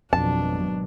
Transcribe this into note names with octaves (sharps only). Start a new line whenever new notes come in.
G#1 F2 B2 F#3 D4 A5